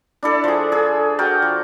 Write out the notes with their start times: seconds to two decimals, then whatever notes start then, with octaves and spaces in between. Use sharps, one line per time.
0.23 D4 E4 A4 D5
0.44 F3 G#4
0.72 G#4 A4
1.19 F#4 A#4 G5 A5
1.42 F3